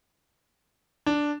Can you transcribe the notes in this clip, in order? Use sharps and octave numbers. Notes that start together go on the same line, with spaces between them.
D4